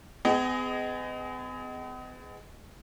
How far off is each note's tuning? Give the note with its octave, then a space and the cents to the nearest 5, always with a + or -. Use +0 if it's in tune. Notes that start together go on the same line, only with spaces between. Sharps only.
B3 +45 G#4 +0 D#5 +0